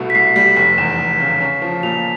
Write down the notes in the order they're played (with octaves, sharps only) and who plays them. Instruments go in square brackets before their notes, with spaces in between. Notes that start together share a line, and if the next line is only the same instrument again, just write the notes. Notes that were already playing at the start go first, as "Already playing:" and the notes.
Already playing: [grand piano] C2 B2 A3
[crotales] B6
[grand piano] C2 [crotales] C7
[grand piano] G3 [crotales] B6
[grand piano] F1 [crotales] B6
[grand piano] E2 [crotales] E7
[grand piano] F1
C#3
C#4
F3
[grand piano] A#2 [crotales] F7